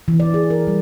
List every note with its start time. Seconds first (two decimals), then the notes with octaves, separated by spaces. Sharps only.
0.08 E3
0.20 D5
0.34 G#4
0.50 A#4
0.67 G3